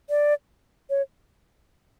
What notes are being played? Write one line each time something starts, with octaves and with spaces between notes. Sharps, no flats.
D5
C#5